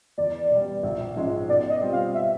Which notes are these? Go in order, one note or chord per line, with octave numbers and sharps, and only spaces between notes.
E2 D5
B2 G3
A#1
G#2 F3 G#3 C#4
B2 D5
D#5
G3 C4 F4
F5
E5